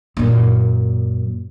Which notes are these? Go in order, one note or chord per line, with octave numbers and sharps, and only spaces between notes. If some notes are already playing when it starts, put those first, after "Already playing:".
F#2 A#2